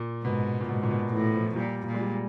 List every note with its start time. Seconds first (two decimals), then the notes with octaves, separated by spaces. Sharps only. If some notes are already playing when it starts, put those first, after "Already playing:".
Already playing: A#2
0.24 G#2 B2
0.61 A#2
0.69 G#2 B2
0.83 A#2
0.90 B2
1.13 A2 E3
1.34 F3
1.56 A#2 G3
1.87 A#2
1.94 G#3
2.01 G3